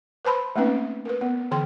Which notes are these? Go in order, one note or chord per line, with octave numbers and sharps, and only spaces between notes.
B4 C5 A5 B5 C6
A3 A#3 C4 C#4 D#4 B4
A#4 B4
B3
D3 E3 G5 C6